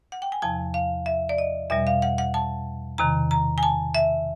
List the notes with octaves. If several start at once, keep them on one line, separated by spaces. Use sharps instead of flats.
F#5
G5
G#5
E2 C3 F3 A5
F5
E5
D5
D#5
E2 B2 G3 E5
F5
F#5
F#5
A5
E2 C3 D#3 A#5
A#5
G#5
A5
E5